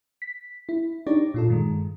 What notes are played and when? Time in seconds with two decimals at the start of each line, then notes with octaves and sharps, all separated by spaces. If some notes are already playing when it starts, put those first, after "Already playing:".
0.22 B6
0.69 E4
1.06 D4 D#4 G4 C#5 D5
1.34 A#2 F4 A4
1.48 G2 D#3 G#3